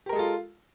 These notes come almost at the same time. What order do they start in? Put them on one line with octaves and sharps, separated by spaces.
G4 A#4 G#3 A4 F4